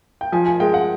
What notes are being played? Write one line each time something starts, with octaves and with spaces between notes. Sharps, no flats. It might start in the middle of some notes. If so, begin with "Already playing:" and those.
G5
F3 G#5
G#5
G#3 G5
F#5